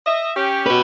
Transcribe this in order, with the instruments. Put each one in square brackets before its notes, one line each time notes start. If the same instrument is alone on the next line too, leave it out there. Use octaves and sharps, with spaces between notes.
[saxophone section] D#5 E5
C#4 G4
[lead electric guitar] F#4 B4